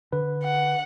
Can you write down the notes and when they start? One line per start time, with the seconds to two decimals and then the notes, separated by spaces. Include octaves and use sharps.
0.13 D3 B4
0.44 F#5